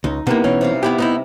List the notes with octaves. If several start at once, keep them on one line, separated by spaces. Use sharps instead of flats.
C#2 D#4
C3 A#3 B3 D#4 E4
B2 E3 C#4
C3 G3 F5
B3 E4 G4
B3 D#4 E4